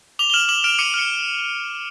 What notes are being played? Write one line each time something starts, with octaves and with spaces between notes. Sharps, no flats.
D6 F7 G7
G7
F6 E7 F#7
D6 E7 F#7
F6 D7 E7
D6 C#7 D#7
F6 C#7